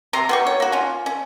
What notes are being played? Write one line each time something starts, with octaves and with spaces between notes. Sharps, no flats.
C3 A#5 C6
B3 G4 C#6
C#5
A#3 F#4
C#4 F4
C#4